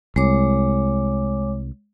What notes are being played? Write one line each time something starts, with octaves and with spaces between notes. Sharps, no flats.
C2 G#3 C#5 D6